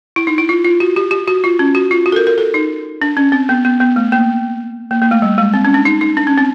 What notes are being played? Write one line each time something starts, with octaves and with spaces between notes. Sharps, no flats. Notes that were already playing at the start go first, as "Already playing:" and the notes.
E4
D#4
E4
F4
F4
F#4
G4
G4
F#4
F4
C#4
F#4
F4
F#4
A4
A#4
A#4
A4
D#4
D4
C#4
C4
B3
B3
B3
A3
A#3
A#3
A#3
A3
G3
G#3
C4
C#4
D4
D#4
D#4
D4
C#4
C4